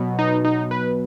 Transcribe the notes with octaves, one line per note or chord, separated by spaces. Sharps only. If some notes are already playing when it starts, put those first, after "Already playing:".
Already playing: B2 F#3 B3
D#4
D#4
B4